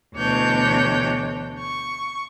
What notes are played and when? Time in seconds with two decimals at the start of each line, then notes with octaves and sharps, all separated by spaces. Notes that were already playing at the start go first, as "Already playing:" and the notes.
0.16 D2 B2 E3 D4 C#5 G6
1.59 C#6